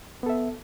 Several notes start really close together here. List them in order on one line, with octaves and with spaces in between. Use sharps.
B3 A4 E5